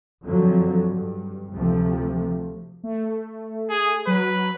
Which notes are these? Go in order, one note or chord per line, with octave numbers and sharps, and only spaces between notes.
F2 D3 F3 F#3
G2
D2 C3 F3 A3
A3
G#4
F#3 B4